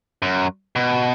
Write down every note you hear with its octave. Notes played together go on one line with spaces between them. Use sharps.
F#2
B2